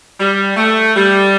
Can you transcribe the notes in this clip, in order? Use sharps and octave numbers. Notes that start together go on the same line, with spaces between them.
G3
A3
G3